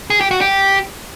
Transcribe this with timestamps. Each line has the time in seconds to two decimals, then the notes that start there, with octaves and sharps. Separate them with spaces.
0.10 G#4
0.21 G4
0.31 F#4
0.41 G4